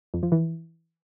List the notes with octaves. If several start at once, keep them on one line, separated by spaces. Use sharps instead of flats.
F2
F3
E3